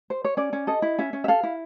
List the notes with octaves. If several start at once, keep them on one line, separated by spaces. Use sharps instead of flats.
C5
C#5
C#4 D5
C#4
A4 D#5
E4
C#4 E5
C#4
E5
A4 F5
E4